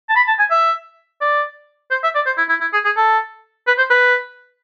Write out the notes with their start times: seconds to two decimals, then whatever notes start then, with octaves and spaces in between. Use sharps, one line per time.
0.09 A5
0.16 B5
0.28 A5
0.39 G#5
0.51 E5
1.21 D5
1.91 C5
2.03 E5
2.15 D5
2.26 C5
2.38 E4
2.49 E4
2.61 E4
2.73 G#4
2.85 G#4
2.97 A4
3.67 B4
3.78 C5
3.90 B4